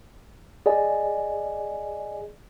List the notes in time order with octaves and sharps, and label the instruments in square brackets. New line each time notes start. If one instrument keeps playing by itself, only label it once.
[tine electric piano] G#4 D5 D#5 G#5